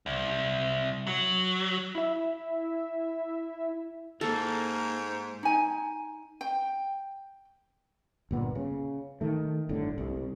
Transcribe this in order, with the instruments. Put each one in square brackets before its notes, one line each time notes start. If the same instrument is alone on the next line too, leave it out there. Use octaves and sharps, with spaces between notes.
[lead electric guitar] C2
F#3
[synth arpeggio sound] E4 E5
[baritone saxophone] G#2 [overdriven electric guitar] A#3 [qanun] A4
[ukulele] D#4 G#5
G5
[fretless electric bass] G1 A#2 B3
C#3
D#3 A3
G1 A2 D3
C2